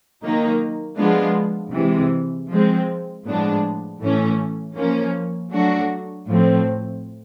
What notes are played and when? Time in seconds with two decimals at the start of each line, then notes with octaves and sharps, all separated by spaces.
0.21 D#3 F#3 A#3 D#4
0.97 F3 G#3 B3 D4 F4
1.73 C3 E3 G#3
2.49 F3 G#3 C4
3.25 A2 F3 G#3 B3 D4
4.00 A2 E3 A3 C#4
4.76 F3 A#3 C#4
5.52 F#3 A3 D4 F#4
6.28 A2 F3 A3 C4